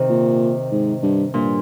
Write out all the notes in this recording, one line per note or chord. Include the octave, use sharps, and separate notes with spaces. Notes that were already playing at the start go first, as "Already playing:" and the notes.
Already playing: C3 D#3
A#2
G#2
G2
G2 A#2